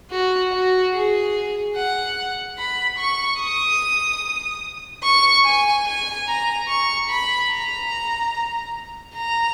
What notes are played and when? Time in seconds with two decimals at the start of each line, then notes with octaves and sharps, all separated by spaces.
0.11 F#4
0.52 F#4
0.94 G#4
1.75 F#5
2.58 B5
2.99 C#6
3.40 D#6
5.04 C#6
5.45 G#5
5.87 G#5
6.27 A#5
6.69 C#6
7.09 B5
7.50 A#5
9.15 A#5